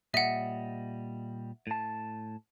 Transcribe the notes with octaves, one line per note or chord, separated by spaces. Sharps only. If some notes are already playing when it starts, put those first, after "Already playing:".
A#2 G3 D#5 E5 F#5
A2 A5